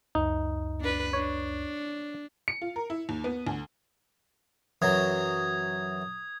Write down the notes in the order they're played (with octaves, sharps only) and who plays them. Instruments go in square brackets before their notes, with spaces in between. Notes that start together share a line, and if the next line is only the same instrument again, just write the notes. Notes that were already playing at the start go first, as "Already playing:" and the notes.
[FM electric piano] C#2 F#2 [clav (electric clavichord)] D#4
[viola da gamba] D4 B4
[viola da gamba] D4 [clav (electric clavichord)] C#5
[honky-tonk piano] C#7
F4
A#4
E4
D#2
B3
D2
[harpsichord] F#2 E3 F#3 [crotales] D#6 G#6